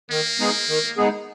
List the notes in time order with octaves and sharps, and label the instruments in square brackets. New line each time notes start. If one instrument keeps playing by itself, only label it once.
[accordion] D#3 [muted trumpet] A#3
[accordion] G#3 B3 D#4 G#4
D#3
G#3 B3 D#4 G#4